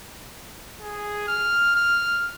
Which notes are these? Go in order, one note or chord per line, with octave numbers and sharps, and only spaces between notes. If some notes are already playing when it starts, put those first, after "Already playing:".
G#4
F6
F6